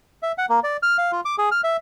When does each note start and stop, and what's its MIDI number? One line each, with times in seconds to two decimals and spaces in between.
0.23 0.32 76
0.38 0.46 78
0.49 0.60 58
0.64 0.77 74
0.83 0.97 89
0.98 1.11 77
1.12 1.21 65
1.25 1.35 86
1.38 1.49 68
1.51 1.61 89
1.64 1.77 76